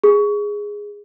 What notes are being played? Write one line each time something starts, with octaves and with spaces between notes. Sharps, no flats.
G#4